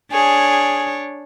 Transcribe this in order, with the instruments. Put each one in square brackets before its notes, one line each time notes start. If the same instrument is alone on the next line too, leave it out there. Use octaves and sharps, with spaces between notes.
[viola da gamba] D4 C#5 [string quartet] G#4